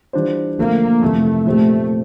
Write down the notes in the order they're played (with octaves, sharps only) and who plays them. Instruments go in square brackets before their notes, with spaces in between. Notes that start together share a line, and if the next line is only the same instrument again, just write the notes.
[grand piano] E3 G3 D4 F4 C5
[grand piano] D3 F3 A3 [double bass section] A#3
[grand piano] F2 C3 E3 [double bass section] A3
[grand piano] A#2 F3 C4 G4 [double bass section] A3